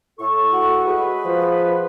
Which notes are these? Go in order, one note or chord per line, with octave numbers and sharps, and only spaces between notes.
A2 A4 C#6
F#4
G#3 G#4 B4
F3